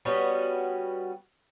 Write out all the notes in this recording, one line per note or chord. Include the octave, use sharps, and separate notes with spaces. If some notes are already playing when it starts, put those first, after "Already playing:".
G3 B3 C#4 F#4